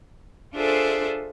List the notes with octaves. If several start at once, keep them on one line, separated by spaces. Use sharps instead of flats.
D4 F4 G#4 A4 C5 E5